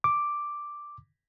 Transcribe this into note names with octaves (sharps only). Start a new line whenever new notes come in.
D6